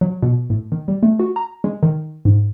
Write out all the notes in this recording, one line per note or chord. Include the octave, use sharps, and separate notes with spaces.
F#3
B2
A2
D#3
G3
A3
F#4
A#5
G#3
D#3
G#2